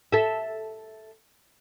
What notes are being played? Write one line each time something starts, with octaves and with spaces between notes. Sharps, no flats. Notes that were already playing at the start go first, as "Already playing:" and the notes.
A4 E5